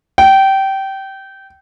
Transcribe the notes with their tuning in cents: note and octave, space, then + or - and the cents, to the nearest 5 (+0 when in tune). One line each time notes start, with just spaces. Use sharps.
G5 -20